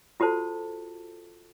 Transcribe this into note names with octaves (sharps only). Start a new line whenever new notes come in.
F4 F#4 A4 C5 A5